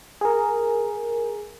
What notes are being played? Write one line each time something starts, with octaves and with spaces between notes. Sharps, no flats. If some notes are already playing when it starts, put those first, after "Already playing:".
G#4 A#4